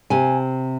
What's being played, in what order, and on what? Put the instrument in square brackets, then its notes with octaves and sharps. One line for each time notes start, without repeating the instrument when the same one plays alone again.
[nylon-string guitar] C3 G#5